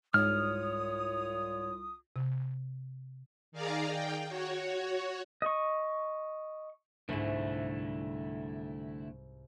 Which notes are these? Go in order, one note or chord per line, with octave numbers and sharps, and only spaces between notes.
C2 G#2 F4 C#5 D#6 F6
C3
D#3 G#4 D5 F5 A#5
G5
F#4 C#5
D#5 C#6
C2 G#2 D3 A3 E4